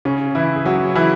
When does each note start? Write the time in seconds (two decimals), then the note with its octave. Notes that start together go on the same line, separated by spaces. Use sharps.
0.05 C#3 C#4
0.35 E3 E4
0.55 G#4
0.66 F#3 F#4
0.95 E3 E4